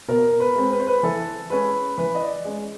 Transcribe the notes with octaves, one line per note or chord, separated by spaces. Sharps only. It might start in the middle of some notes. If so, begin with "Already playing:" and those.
B2 A#4
B4
G#3 C4
B4
C5
B4
E3 A4
G#3 C#4 B4
E3 B4
D#5
D5
G#3 C#4